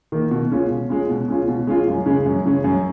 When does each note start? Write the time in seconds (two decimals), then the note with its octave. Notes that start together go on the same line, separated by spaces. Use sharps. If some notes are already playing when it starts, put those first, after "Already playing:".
0.12 D#3 A#3
0.31 B2
0.52 G#3 C#4 F4
0.70 B2
0.89 G#3 C#4 F4
1.09 B2
1.28 G#3 C#4 F4
1.48 B2
1.67 G#3 C#4 F4
1.87 F#2
2.06 C#3 G#3 C#4
2.26 F#2
2.45 C#3 G#3 C#4
2.64 F#2